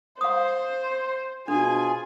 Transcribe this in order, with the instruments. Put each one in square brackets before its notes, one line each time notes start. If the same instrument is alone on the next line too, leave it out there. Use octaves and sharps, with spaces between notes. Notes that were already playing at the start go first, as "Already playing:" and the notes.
[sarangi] C5 [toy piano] F5 D#6
[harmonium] B2 F4 G#4 [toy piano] D4 [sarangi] G#5